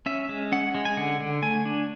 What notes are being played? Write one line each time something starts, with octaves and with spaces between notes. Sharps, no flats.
C#4 E5
G#3
C#4 F#5
G#3
G#5
D3 F#5
D3
A3 G#5
D4